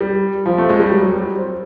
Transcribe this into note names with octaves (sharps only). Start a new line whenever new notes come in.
G3
F3
A3
G#3
G3
F#3
F#3
G3
C4